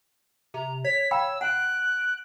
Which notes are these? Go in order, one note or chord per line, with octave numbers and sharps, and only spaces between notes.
C3 A#5
C#5 B6
F5 G5 B5 E6
F#5 F#6 D7